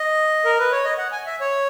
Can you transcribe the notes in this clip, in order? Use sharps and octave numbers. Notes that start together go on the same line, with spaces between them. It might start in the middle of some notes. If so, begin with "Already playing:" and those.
Already playing: D#5
A#4
B4
C#5
D#5
F#5
G#5
E5
C#5